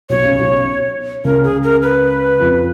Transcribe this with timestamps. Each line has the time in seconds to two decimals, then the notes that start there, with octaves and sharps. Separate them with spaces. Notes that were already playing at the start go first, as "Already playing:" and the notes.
0.09 B1 B2 C#5
0.24 C#2 C#3
0.39 B1 B2
1.24 C#2 C#3 A#4
1.44 G#4
1.63 A#4
1.82 B4
2.40 F2 F3